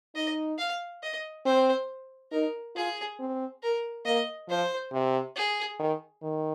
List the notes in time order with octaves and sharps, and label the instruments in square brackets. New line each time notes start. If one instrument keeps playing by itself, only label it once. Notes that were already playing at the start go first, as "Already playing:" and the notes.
[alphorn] D#4 [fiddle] D#5
[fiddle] F5
D#5
[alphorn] C4 [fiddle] C5
[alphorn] D#4 [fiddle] A#4
[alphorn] F4 [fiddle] G#4
[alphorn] C4
[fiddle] A#4
[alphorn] A#3 [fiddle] D#5
[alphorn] F3 [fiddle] C5
[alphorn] C3
[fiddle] G#4
[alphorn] D#3
D#3